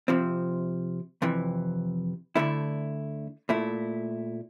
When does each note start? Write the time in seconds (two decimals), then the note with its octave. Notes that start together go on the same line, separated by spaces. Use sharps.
0.08 C3 F3 C4
1.22 F2 C3 E3
2.36 D2 D3 A3 E4
3.49 A#2 A3 E4